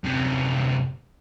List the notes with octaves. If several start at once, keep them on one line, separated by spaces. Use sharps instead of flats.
F#2 C3